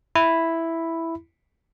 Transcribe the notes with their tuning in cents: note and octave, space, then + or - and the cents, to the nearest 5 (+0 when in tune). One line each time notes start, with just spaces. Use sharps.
E4 +0 B5 +0